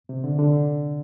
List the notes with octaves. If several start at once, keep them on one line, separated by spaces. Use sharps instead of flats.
C3
D3
D3